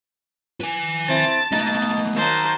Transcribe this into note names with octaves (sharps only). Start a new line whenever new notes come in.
B4 G#5
C4 E4 A5 A6
B2 A3 A#3 D#4 D#5
D#3 F#3 A#3 C5 A5